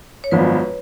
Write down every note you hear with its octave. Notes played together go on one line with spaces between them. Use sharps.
C#5
G#1 F#2 F3 B3 D4 B4